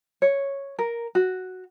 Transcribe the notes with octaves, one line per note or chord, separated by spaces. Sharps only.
C#5
A#4
F#4